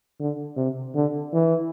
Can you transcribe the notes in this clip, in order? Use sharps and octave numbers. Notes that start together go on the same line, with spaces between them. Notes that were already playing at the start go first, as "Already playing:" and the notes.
D3
C3
D3
E3